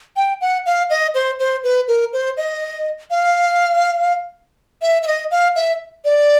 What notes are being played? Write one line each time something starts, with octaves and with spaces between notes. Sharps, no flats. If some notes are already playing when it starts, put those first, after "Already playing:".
G5
F#5
F5
D#5
C5
C5
B4
A#4
C5
D#5
F5
E5
E5
D#5
F5
E5
D5